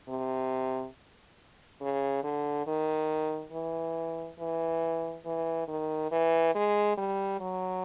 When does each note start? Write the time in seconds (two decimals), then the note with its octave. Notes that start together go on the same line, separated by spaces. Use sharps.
0.08 C3
1.81 C#3
2.24 D3
2.67 D#3
3.52 E3
4.39 E3
5.25 E3
5.68 D#3
6.11 E3
6.55 G#3
6.98 G3
7.40 F#3